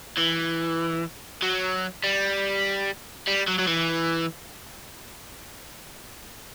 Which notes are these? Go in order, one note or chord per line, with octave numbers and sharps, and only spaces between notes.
E3
F#3
G3
G3
F#3
F#3
E3